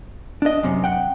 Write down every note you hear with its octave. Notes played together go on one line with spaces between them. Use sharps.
D4 D#5
F#2 C3 C#4
F#5 G5